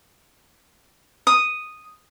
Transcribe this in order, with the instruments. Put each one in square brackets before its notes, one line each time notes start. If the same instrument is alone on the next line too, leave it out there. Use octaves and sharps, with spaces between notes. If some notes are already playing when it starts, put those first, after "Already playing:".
[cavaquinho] D#6